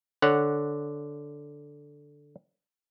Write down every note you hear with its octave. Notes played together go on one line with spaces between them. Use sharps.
D3 C#5 F#5